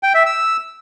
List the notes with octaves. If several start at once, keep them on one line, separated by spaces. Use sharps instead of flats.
G5
E5
E6